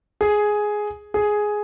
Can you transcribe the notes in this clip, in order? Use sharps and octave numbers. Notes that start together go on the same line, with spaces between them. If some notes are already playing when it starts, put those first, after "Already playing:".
G#4
G#4